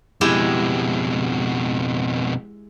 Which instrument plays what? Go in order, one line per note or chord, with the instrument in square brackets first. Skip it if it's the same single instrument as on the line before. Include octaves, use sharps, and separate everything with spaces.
[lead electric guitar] F2 B2 [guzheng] G#3 E4 G4